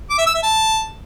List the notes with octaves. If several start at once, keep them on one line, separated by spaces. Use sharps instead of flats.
D6
E5
E6
E5
A5